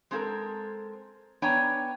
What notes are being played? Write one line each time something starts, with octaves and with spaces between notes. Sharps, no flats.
G#3 C4 F#4 G4 A4 A#4
B3 D4 C#5 G5 G#5 A#5